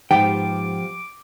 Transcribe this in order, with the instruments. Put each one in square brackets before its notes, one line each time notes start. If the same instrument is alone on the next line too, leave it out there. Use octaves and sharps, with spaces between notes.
[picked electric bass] G#2 [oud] F3 B3 G4 [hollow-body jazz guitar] G5 [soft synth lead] D6